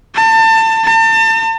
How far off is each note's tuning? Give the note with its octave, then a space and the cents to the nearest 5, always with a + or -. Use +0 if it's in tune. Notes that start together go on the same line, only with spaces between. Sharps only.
A5 +30
A5 +35